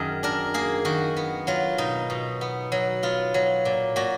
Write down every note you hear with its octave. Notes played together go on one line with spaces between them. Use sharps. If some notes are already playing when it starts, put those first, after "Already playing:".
Already playing: F#2 D#3 G#4
D4 A#4
A#3 G#4
D#3 F#4
B3
F#3 F4
B2 D#4
B2
B3
F#3
B3 F4
F#3
A#2
A#2 F#4